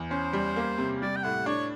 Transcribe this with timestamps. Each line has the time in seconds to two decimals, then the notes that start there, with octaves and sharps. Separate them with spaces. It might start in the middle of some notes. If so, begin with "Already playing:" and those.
Already playing: E2
0.11 C#4 C5
0.33 G3
0.56 A#3
0.78 C3
1.02 G3 D5
1.16 G5
1.23 A2 F#5
1.46 D4 C#5